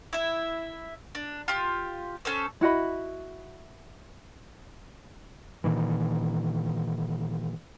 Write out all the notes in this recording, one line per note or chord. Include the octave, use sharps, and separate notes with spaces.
E4 E5
D4
F4 G4
C#4 A4 C5
E4 F#4 D#5 B5
A#2 D#3 E3